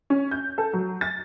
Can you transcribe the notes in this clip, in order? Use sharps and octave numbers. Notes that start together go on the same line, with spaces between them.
C#4
G6
A4
F#3
A6